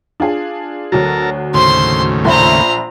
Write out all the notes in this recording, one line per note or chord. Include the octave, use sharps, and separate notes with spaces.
D4 F4 G#4
D2 F#3 A4 A#4
D#2 A2 C#3 C5 C6
A#1 C5 E5 A#5 B5